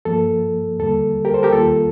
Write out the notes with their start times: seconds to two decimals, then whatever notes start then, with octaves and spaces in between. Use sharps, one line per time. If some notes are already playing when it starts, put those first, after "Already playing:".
0.05 G2 F3 A#3 A4
0.79 D#2 D3 G3 A#3 A4
1.25 G4 A#4
1.34 A4 C5
1.43 G4 A#4
1.52 D#2 D#3 G3 A#3 F4 A4